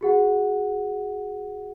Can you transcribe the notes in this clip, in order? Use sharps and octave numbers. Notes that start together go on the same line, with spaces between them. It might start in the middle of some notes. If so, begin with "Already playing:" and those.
F#4 G#4 F#5